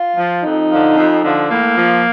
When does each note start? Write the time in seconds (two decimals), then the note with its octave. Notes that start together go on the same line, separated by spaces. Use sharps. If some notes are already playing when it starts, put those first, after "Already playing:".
Already playing: F4
0.17 F3
0.43 F2 D#4
0.70 D3 F3
0.96 F2
1.23 D3 F3
1.49 A2 A#3
1.75 F3